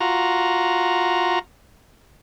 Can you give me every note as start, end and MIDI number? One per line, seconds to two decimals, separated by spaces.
0.01 1.39 65
0.01 1.39 66
0.01 1.39 82